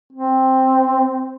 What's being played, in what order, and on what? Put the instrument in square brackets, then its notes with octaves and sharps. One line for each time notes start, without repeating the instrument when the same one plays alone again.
[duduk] C4